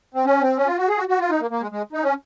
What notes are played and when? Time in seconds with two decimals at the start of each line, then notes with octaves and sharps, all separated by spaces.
0.14 C4
0.26 C#4
0.41 C4
0.57 C#4
0.67 F4
0.78 F#4
0.88 G#4
0.98 F#4
1.08 F#4
1.20 F4
1.30 D#4
1.40 A#3
1.51 A#3
1.61 G#3
1.71 G#3
1.93 D#4
2.03 C#4